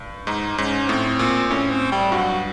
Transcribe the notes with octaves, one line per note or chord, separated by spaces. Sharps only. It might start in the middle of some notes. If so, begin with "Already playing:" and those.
Already playing: G2
G#2 D#4
G#2 C#4
A2 C4
A#2
A2 C#4
C4
G3
G2 F#3